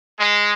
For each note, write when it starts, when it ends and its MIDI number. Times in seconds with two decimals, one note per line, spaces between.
0.19 0.53 56